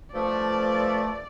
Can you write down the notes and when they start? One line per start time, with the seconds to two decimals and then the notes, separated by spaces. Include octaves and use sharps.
0.14 G2 F3 A3 D5